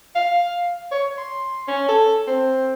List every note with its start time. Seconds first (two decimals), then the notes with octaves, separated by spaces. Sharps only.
0.15 F5
0.91 C#5
1.18 C6
1.68 C#4
1.89 A4
2.28 C4